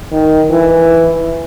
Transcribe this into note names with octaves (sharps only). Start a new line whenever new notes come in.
D#3
E3